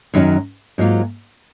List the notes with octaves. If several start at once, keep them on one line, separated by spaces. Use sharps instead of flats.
F#2 D#3 F#3 C#4
G#2 F#3 A#3 F4